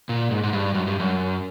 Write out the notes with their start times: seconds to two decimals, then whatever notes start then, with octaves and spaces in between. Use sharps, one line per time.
0.09 A#2
0.31 G#2
0.43 G#2
0.53 G2
0.75 F#2
0.87 G2
1.00 F#2